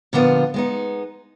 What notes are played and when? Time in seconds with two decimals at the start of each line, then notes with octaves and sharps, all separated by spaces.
0.13 A#2 D3 F3 B3 F4
0.54 G#3 B3 D#4